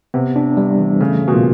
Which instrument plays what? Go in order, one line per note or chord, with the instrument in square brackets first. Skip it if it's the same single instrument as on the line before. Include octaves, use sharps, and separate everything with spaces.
[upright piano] C3 [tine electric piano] B3
[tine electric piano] D4
G3
E3
[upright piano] C#3 [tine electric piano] A3
[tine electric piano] C#3
[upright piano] B2
A#2